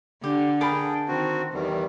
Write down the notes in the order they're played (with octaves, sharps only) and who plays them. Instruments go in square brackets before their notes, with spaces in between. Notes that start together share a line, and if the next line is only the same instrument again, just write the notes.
[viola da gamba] D3 [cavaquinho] G4
[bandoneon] G#4 G5 [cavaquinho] A#4 A5 B5
[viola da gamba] D#3 [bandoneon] C4 F#4
[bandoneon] E2 D#3 G3 [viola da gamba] E3